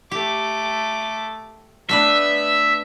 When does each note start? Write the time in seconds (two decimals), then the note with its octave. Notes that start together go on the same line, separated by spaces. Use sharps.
0.11 A3 G4 D6
1.89 A3 B3 D4 B4 E5